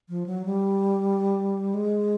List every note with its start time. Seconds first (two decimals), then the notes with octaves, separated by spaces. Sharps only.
0.09 F3
0.26 F#3
0.46 G3
1.74 G#3